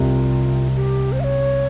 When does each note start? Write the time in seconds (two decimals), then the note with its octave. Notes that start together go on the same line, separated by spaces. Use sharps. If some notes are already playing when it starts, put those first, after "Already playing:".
Already playing: C2 C3 F4
0.76 G4
1.12 C5
1.20 F5
1.24 C#5